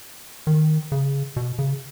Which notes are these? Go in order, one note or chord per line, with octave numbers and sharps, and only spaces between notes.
D#3
C#3
B2
C#3